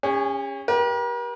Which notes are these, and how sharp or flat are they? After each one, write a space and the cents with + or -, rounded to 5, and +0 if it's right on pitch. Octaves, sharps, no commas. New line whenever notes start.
C#4 +0 G#4 -45
G4 +0 A#4 +45